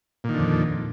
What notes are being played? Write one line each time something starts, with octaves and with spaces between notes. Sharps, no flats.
F2 A#2 D3 D#3